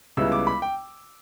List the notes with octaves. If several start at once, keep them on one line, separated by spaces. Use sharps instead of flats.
C#2 C#3 G3 B3 E4 E6
D6
B5
G5